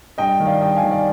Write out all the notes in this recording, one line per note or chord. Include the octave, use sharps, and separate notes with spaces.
G2 D#5 G5
D#3
D5 F5
G2 D#5 G5
F5 G#5
D#3
D5 F5